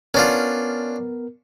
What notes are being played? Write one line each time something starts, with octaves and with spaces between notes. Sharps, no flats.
B3 C#4 D4 F4 A#4